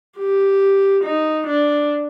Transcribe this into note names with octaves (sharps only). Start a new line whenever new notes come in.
G4
D#4
D4